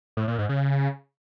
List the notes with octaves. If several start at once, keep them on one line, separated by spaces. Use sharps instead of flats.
A2
A#2
G#2
C#3